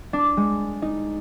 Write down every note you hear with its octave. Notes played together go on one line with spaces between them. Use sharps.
D4
G#3
D#4